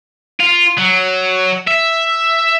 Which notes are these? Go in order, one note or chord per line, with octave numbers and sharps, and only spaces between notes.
F4
F#3
E5